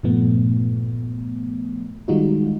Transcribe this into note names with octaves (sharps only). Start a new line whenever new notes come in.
G2 A#2 F3 A3 B3
D#3 G3 G#3 D#4 F4 F#4